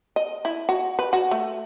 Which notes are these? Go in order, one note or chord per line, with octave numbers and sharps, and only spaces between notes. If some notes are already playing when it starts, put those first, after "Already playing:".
D#5
E4
F#4
B4
F#4
A3